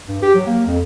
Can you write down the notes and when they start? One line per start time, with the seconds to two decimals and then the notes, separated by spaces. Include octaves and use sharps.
0.08 G2
0.22 G4
0.35 F#3
0.47 A#3
0.67 F2